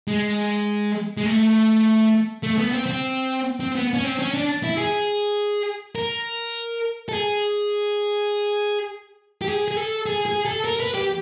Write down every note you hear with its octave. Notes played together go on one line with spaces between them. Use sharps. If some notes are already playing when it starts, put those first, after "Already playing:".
G#3
G#3
A3
A3
B3
C4
C4
C4
B3
C#4
C4
C#4
D4
E4
G#4
A#4
A4
G#4
G4
G#4
G#4
A4
G#4
G#4
A4
A#4
B4
G4